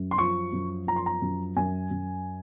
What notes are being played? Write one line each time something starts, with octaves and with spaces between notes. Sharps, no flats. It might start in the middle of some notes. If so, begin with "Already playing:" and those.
Already playing: F#2
C6
F3 C#6
F#2
F3 A#5
C6
A#5
F#2
F#2 G#5
F#2